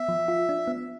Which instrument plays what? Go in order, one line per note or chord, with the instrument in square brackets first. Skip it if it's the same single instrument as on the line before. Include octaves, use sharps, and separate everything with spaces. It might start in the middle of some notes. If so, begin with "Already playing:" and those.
Already playing: [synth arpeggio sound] B3 [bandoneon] E5
[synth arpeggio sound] F3
F4
D4
B3